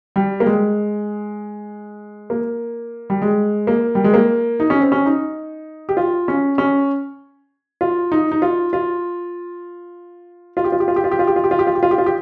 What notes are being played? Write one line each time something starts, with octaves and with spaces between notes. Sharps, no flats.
G3
A#3
G#3
A#3
G3
G#3
A#3
G3
G#3
A#3
D#4
C#4
C4
C#4
D#4
G4
F4
C#4
C#4
F4
D#4
D#4
F4
F4
F4
G4
F4
G4
F4
G4
F4
G4
F4
G4
F4
G4
F4
G4
F4
G4
F4
G4
F4
G4